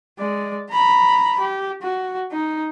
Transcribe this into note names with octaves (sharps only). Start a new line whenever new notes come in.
G#3 D5
A#5 B5
G4
F#4
D#4